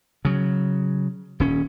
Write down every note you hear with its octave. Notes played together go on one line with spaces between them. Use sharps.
C#3 F#3
D#1 C#4